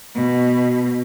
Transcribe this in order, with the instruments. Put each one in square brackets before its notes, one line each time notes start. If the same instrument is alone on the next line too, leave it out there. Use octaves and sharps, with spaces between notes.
[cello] B2